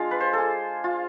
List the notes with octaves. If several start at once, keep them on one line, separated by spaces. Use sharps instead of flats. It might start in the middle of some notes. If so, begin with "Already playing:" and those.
Already playing: G#3 D4 F4
B4
C5
G#4 A4
F4